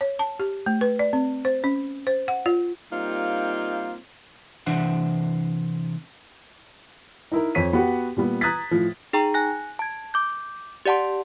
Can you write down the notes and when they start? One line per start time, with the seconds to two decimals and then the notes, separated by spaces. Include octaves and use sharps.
0.01 C#5
0.19 A5
0.40 G4
0.66 A3
0.81 B4
0.99 D5
1.13 C4
1.45 C5
1.64 C#4
2.07 C5
2.28 F#5
2.46 F4
2.91 G3 A#3 C4 D#4 F4
4.66 C3 E3 D4 C5 E5 F#5
7.32 D#4 E4 A#4
7.55 F2 C#5 B6 D#7
7.73 B3 F#4 G4
8.17 A#2 G3 B3
8.41 A#5 D#6 F#6 G#6 A6 B6
8.71 A2 F3
9.13 D#4 G#4 G5 A#5 C#6
9.34 G#5 F#6 A#6
9.79 A5 G#6
10.14 D6 G6
10.86 G4 D5 F#5 A5 C6